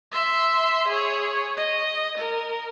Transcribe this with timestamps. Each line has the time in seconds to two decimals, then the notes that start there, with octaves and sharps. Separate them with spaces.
0.12 E5 C6
0.88 G#4 C#5
1.57 D#5
2.18 A#4